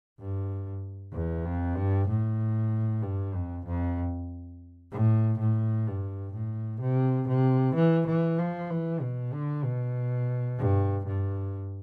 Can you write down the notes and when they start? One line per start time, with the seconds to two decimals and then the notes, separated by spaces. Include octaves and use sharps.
0.20 G2
1.13 E2
1.45 F2
1.76 G2
2.08 A2
3.03 G2
3.35 F2
3.66 F2
4.92 A2
5.39 A2
5.87 G2
6.33 A2
6.81 C3
7.28 C3
7.75 E3
8.07 E3
8.38 F3
8.70 E3
9.01 B2
9.33 D3
9.64 B2
10.58 G2
11.06 G2